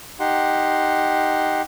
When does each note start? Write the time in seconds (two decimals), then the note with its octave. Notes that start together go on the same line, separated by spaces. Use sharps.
0.20 D#4 G4 F#5 C6